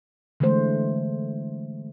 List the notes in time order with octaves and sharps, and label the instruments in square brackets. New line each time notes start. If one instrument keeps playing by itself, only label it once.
[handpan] D3 E3 G#3 A3 C5